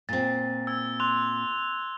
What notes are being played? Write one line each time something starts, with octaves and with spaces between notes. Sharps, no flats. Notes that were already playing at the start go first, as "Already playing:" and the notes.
A#2 C4 A6
E6 G#6
C6 D6 F#6 F7